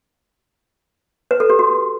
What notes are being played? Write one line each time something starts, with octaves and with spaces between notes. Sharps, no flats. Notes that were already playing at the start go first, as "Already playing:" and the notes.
B4
A4
G4
F#4